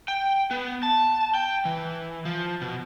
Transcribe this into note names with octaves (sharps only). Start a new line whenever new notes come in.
G5
B3
A5
G5
E3
F3
B2